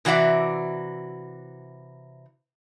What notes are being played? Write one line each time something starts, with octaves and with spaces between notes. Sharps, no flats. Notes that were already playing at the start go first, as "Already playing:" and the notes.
C3 E3 F#4 D5 E5